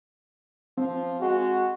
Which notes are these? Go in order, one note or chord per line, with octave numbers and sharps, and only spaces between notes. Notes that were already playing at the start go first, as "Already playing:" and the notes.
F3 C4
G#3 F#4